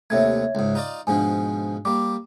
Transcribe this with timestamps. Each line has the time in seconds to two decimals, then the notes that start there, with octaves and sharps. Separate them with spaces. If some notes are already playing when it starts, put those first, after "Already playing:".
0.10 D#2 C3 A3 C#5 E5 G#6
0.55 C#2 G#2
0.75 D#4 F4 D5
1.07 G#2 B2 F3 D4 G#5
1.85 G3 A#3 D6